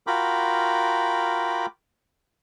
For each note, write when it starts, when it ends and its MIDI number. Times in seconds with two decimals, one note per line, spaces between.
0.07 1.66 65
0.07 1.66 66
0.07 1.66 70
0.07 1.66 79
0.07 1.66 83
0.07 1.66 86